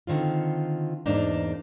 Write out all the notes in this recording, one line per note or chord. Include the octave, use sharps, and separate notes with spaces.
D3 D#3 C4 F4
E2 G#2 A#3 D4 D#4